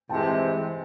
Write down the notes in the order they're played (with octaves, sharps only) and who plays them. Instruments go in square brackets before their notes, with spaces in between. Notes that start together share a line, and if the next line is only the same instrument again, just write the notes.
[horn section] C3 E3 G#3 C4 [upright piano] G5 A5